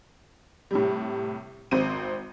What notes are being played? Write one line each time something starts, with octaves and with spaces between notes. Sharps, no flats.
A2 C3 G3
G#1 C4 D#7